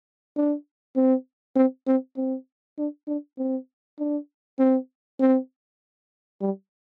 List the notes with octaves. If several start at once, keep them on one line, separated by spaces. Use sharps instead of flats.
D4
C4
C4
C4
C4
D4
D4
C4
D4
C4
C4
G3